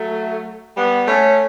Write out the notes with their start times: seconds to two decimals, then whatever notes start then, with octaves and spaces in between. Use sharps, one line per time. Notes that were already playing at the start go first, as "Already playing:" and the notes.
Already playing: F#3 A3
0.76 G3 B3
1.07 A3 C#4